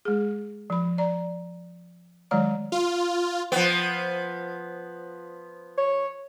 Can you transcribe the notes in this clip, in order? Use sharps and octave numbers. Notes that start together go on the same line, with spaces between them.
G#3 G#4
F3 B5
D5 A#5
D#3 F#3 G#3 C#5 D5 A#5
F4
F3 B3
C#5